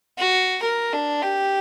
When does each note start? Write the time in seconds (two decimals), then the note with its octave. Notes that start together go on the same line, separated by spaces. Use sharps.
0.18 F#4
0.63 A#4
0.93 D4
1.22 G4